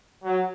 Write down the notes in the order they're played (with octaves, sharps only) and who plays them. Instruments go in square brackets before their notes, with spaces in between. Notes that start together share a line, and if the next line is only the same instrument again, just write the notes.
[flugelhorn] F#3